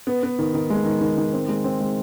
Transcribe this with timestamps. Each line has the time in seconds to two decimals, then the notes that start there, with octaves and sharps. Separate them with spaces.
0.07 B3
0.23 B3
0.39 D#3
0.54 D#3
0.70 G#3
0.85 D#3
1.01 D#3
1.17 D#3
1.33 C4
1.48 G#3
1.64 C4
1.80 G#3